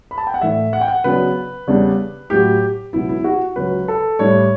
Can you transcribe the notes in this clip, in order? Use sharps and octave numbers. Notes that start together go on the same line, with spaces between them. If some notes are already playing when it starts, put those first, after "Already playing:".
B5
A5
G5
F#5
A2 E3 A3 D4 E5
F#5
G5
F#5
C#3 F#3 B3 D4 B4
E2 C#3 G3 D4
A2 F#3 C#4 G4
C#2 B2 F#3 B3 E4
E4
F#4
C#2 C#3 F#3 C#4 B4
A4
A2 G3 D4 C#5